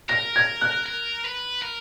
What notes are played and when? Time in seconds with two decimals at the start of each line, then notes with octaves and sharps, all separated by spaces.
0.09 A#4 A#6
0.36 G#6
0.61 F#6
0.86 A#4
1.25 B4
1.62 A#4